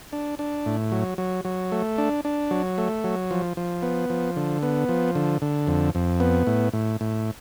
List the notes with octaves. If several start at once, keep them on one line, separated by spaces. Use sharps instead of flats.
D4
D4
A2
F#3
F#3
F#3
A3
D4
D4
F#3
A3
F#3
F3
F3
B3
F3
D3
B3
F3
D3
D3
F2
F2
B3
A2
A2
A2